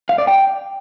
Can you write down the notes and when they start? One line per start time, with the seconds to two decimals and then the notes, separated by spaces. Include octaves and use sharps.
0.09 F5
0.18 D5
0.27 G5